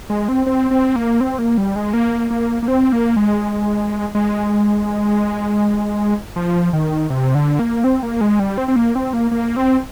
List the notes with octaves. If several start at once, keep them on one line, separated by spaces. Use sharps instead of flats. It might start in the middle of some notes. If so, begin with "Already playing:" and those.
G#3
C4
C4
C4
A#3
C4
A#3
G3
G#3
A#3
A#3
A#3
C4
A#3
G#3
G#3
F3
D#3
C3
D3
A#3
C4
A#3
G#3
G3
C4
C4
A#3
C4
A#3
A#3
C4